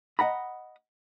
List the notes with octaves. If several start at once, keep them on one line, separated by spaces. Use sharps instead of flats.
D#5 F#5 A#5 B5